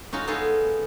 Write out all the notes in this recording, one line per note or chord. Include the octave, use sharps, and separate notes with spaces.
C#4 D#4 F4 F#4
B3 D#4 F4 G#4 A4 B4